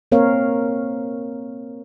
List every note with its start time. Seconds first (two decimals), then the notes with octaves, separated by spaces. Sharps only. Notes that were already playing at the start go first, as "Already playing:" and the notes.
0.12 A#3 C4 A#4 C#5 F5